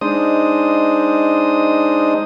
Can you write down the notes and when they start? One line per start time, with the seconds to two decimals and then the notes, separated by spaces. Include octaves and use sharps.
0.01 G#3 D4 D#4 C5 D#6